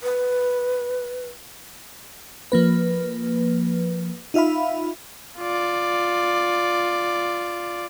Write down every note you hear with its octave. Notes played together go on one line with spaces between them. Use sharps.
B4
F3 A#3 B4
D#4 F4 E5 F5 B5
F4 D5